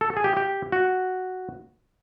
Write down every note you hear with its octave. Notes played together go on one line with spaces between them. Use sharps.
A4
G#4
G4
G4
F#4